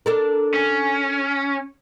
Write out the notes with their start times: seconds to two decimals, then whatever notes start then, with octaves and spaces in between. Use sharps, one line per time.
0.06 D4 A4 A#4
0.54 C#4